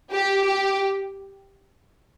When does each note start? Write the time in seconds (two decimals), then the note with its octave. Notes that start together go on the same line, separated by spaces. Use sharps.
0.11 G4
0.43 G4